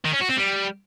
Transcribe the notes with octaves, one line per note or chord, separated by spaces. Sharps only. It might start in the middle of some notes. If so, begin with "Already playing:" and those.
D#3
C#4
F#4
C4
G3